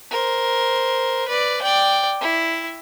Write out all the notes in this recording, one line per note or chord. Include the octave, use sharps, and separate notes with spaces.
A#4 C5
B4 D5
D5 G5
E4